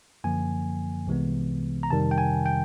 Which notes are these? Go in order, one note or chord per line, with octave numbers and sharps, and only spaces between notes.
F#2 D3 F3 A#3 G#5
C2 C3 E3 G#3 B3
A#5
F2 C3 D#3 G3 A5
G5
G#5
G5